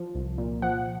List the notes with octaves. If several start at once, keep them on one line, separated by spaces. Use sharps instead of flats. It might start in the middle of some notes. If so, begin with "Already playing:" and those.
Already playing: F3
C2
A#2
F3 F#5